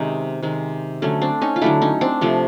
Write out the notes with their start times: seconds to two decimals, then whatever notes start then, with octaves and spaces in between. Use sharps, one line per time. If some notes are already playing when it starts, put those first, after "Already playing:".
Already playing: C3 D#3 G#3 C#4 D#4
0.43 C3 D#3 G#3
1.02 D3 F#3 A3 C#4
1.22 C4 D4
1.42 C#4 D#4
1.56 F4
1.61 D3 F#3 A3 D4 E4
1.82 C#4 D#4
2.01 C4 D4
2.21 C3 F3 A3